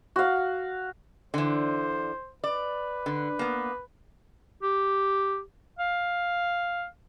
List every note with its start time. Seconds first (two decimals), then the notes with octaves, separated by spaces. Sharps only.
0.16 F#4 F5
1.34 D3 E3 C5
2.44 B4 D5
3.06 D3
3.39 A#3 B3
4.63 G4
5.79 F5